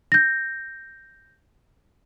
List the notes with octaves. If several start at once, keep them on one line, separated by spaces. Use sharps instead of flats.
G6 A#6